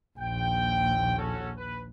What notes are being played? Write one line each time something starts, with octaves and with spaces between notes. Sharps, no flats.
A#1 D#2 G5
C#4 F#4 A4
B4